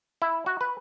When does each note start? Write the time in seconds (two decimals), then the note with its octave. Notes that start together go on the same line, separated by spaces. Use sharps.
0.22 E4
0.46 F#4
0.61 B4